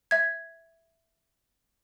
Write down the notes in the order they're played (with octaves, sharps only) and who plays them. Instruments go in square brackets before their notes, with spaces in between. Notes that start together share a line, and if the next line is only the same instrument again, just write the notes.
[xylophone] E5 G#6